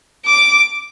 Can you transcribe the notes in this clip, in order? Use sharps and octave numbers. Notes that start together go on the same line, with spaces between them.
D6